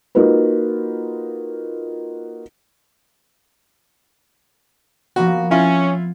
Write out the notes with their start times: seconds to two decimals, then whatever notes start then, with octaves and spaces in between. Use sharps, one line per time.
0.15 A#3 D#4 F4 F#4 B4
5.16 F3 A#3 B3 F#4
5.51 C4 C#4 E4 F4